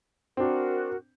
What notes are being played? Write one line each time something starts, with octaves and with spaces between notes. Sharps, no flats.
C4 D4 F#4 A#4